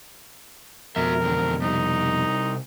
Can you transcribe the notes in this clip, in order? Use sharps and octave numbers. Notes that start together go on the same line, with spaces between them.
F2 B2 F#4 A#4 E5
E2 D3
C3 G3 D#4